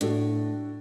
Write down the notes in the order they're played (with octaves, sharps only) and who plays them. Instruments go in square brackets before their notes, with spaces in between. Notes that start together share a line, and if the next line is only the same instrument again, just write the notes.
[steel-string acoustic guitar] A2 [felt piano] D4 F#4 A4